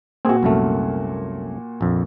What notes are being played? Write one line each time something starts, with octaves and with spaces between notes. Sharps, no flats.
A#2 C4 F#4 G#4
C2 F#2 A3
A#1 F2